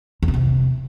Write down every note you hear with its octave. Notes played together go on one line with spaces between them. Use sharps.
E2
C#3
C3